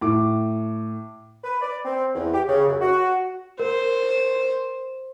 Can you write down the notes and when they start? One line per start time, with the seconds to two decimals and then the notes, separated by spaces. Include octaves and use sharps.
0.01 A2 D6
1.44 B4
1.61 D5
1.84 C4
2.14 E2
2.32 G4
2.48 C#3
2.67 F#2
2.81 F#4
3.59 A#4 C5